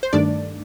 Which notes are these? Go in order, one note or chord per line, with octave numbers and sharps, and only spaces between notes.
C5
G2 D#3 A3 D4 D5